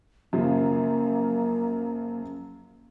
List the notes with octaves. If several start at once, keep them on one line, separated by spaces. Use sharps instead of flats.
F#2 C#3 F3 A#3